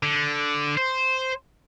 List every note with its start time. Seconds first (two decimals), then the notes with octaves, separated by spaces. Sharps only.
0.03 D3
0.78 C5